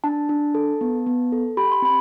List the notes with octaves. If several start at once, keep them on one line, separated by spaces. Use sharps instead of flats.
D4 A5
D4
A4
B3
B3
A4
G4 B5
C6
C4 B5